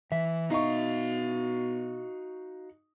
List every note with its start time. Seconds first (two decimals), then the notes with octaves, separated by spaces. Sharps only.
0.12 E3 E5
0.50 B2 D#4 F#4 F5 C#6